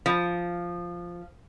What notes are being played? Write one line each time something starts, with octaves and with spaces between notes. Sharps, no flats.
F3